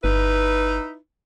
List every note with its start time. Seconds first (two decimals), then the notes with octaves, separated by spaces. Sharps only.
0.04 G1 D#4 E4 B4